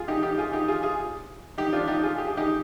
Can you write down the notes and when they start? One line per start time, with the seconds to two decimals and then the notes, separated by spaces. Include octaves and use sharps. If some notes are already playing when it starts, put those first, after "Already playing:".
Already playing: F4 G#4
0.08 D#4 G4
0.23 D#4 G4
0.38 F4 G#4
0.53 D#4 G4
0.68 F4 G#4
0.83 F4 G#4
1.58 D#4 G4
1.73 D4 F4
1.88 D#4 G4
2.03 F4 G#4
2.18 G4
2.27 G#4
2.37 D#4 G4